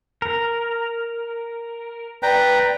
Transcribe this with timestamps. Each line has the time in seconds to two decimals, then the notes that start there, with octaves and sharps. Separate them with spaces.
0.22 A#4
2.23 B4 D5 G5 A#5